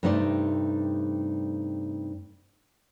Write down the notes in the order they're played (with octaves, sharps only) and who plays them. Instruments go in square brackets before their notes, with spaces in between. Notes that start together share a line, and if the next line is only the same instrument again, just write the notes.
[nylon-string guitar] G2 C3 A3 D#4 C5 D5